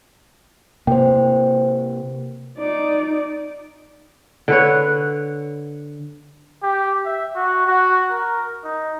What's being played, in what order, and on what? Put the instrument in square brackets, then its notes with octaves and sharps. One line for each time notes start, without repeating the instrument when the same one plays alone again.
[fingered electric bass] C3 A#3 [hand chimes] C5 G5
[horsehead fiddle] D#4 D5
[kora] D3 B4 C#5
[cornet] G4
E5
F#4
F#4
A#4
D#4